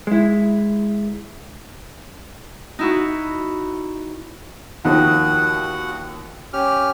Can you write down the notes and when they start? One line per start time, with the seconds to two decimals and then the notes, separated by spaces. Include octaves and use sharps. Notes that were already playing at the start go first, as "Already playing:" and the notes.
0.07 G#3 E4
2.79 D#4 E4 F#4
4.85 D#2 D#3 F3 F#4 F#5
6.53 C#4 G4 F6